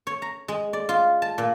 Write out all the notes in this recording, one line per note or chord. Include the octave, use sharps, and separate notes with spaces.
C#5
A#5
G#3
D5
F4
A5
A#2